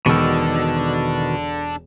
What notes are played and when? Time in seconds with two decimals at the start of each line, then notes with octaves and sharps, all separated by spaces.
0.06 E1 B2 D#3 D4 A4